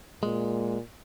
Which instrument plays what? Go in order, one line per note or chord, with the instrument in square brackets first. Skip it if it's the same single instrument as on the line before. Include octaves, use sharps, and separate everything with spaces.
[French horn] A#2 [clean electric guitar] G#3